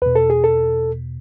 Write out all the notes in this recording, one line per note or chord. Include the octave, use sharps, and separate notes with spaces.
E2 B2 B4
A4
G#4
A4